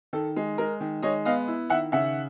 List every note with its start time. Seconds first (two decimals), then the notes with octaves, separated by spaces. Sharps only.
0.13 D#3 A4
0.36 G#3
0.58 G#3 A#4
0.81 D#3
1.02 G#3 C#5 D#5
1.25 B3 D#5 F5
1.48 E4
1.70 D#3 E5 F#5
1.92 C#3 E5 F#5